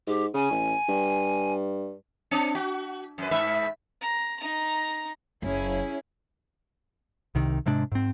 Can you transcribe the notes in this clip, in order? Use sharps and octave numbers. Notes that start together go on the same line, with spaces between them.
G#2 G4
C#3 G#5
A1
G2
C4 D4
F#4
F#2 B4
G#2 B4 E5
A#5
D#4 A#5
F#1 C#4 E4 G#4
C2 C3 D#3
G#2 C3 G#3 D4
G#2 C4